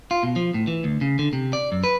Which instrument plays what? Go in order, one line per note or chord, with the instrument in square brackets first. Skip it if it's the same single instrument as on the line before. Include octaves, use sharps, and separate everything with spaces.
[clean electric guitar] F4
B2
F3
A2
E3
D2
C#3
D3
C3
D5
F#2
B4